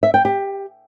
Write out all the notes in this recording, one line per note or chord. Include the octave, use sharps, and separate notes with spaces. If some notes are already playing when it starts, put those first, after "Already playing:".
E5
G5
G4